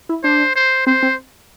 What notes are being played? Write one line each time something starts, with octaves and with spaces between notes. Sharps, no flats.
E4
D4 C5
C5
C4 C5
C4